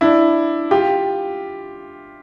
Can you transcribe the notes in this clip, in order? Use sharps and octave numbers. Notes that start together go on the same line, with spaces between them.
D4 E4
F4 G4